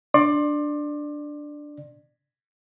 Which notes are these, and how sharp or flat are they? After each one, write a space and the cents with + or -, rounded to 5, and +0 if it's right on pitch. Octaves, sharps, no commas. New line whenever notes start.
D4 +0 D5 +20 C6 +30